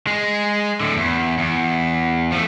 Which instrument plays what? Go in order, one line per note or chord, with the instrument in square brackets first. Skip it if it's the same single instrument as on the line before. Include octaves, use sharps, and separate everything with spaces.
[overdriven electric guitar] G#3
A2 D3
E2
E2
F3 A3